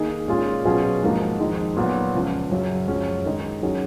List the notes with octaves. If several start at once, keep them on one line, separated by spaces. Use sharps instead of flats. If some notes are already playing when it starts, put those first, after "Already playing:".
Already playing: D#3 A#3 D#4 G#4
A#2 G#3 C#4 F4 G#4
B2 F#3 C#4 F4 G#4
G#2 F3 A#3 D#4 F#4
F2 D#3 G#3 D#4
A#2 F#3 B3 F#4
C#2 C#3 F3
F#2 C#3 F#3 C#4
F#2 F3 G#3 C#4 F#4
D#3 G#3 D#4
D#3 F#3 C#4 G#4